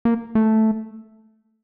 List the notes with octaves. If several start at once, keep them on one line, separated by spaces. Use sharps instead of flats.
A#3
A3